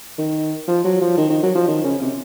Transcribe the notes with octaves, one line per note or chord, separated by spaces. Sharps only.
D#3
F3
F#3
F3
D#3
D#3
F#3
F3
D#3
C#3
C3